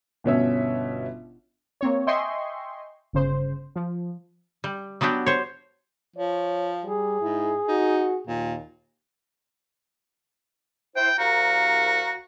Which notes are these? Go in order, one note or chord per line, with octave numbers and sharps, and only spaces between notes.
G1 B2 C#4 E5
A#3 C4 C#5
D#5 E5 G5 G#5 C6 C#6
G1 C#3 C5
F3
G3
F#3 B3 D4 F#4 G4
C5 C#5
F3 C#5
G3 G#4
G#2 E4
D#4 F#4
D#2 A#2
E4 C5 G5
C2 F#4 F5 A#5